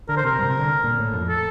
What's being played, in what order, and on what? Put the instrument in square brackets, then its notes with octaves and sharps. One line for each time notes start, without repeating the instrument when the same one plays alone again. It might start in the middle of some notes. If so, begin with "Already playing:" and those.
[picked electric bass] D3 [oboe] A#4
[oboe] C5
[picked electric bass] C3 [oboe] A#4
[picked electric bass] G2
C3
D3
A#2
A2
F2
[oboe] A4